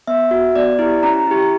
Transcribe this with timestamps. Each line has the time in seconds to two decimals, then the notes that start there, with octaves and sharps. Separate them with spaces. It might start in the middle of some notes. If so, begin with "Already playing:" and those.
0.07 B3 E5
0.31 F#4
0.56 B3 D5
0.79 E4 G4
1.03 C#4 A#5
1.27 E4 G4